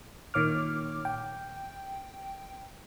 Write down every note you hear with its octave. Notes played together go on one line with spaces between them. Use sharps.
A#2 D#3 C#5 D6 F6
G5